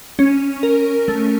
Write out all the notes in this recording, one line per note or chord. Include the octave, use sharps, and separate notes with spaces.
C#4
A#4
A3